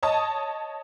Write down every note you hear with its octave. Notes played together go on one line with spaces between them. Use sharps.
C#5 D#5 A5 D#6